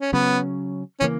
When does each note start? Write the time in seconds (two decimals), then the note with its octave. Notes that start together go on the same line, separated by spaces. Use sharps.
0.01 C#4
0.13 C#3 F#3 B3 C#4
1.00 C#3 E3 A#3 C#4